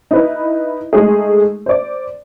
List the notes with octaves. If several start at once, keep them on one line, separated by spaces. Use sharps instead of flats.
D#4 E4 B4
G#3 A3 D#4 G#4
C5 D5